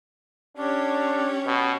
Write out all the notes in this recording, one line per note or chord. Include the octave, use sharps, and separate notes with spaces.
C#4 D4 G4 C#5
B2